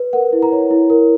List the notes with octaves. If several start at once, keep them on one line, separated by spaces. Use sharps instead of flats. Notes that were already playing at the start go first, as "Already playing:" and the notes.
Already playing: B4
A#4 F#5
E4
A#5
C#5
E4
A#4